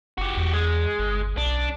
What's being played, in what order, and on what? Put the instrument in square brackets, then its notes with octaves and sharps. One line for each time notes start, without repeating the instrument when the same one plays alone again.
[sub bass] F#1 [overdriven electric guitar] F#4 G4
[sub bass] E2
[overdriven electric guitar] G#3
[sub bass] G1
[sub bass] B1 [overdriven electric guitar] D4